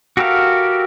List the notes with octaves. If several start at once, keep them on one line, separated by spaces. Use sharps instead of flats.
F#4 G4 A4 A#4 F5